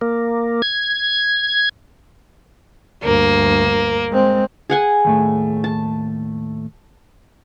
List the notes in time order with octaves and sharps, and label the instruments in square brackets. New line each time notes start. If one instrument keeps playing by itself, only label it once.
[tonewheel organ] A#3
G#6
[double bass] D2 G2 [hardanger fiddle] A#3
[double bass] G#3 C4
[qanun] G#4 F#5 G#5
[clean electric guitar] D#2 A2 A3
[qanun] A5